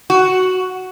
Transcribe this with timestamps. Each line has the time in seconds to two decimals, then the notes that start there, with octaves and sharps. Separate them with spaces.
0.10 F#4